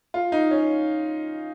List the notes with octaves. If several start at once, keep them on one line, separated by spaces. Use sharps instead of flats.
F4
D#4
C#4